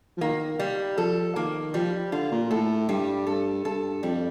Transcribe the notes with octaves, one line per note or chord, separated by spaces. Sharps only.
F3
D#3 A#3
G3
F3 A4
D#3 A#3
F3 G3
D3 F4
A#2
A2 A4
G2 G3
G2 A4
G2 A4
F2 G3